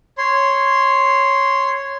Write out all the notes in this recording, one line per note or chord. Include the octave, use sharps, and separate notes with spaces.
C#5 C6